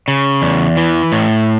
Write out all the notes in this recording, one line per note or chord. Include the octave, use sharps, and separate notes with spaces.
C#3
E2
E3
A2